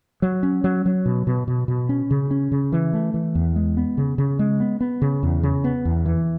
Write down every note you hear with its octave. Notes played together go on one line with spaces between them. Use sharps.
F#3
C#4
F#3
F#3
B2
B2
B2
B2
C#4
C#3
C#4
C#3
E3
A3
E3
E2
G#3
B3
C#3
C#3
G#3
B3
B3
C#3
E2
C#3
B3
E2
E3